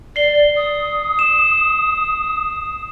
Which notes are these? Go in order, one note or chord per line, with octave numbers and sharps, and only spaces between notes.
D5 C7 G7
D#6
E7